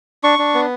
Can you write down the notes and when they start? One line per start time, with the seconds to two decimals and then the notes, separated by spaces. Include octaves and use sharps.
0.24 D4 C#6
0.39 D4
0.54 B3